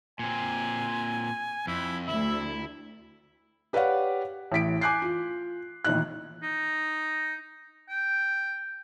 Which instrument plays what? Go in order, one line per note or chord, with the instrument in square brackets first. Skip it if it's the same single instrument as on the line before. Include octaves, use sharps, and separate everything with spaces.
[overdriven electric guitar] A#2 C4 [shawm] G#5
[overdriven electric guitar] F2 [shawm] E4
[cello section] D2 [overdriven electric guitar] E4 [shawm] E5
[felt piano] G4 B4 C#5 D5 F5 F#5
A1 A2 B6 D7
G#5 D6 F#6 G6 C7
F4
A1 A#2 D#3 D#4 E4 F#6
[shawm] D#4
G5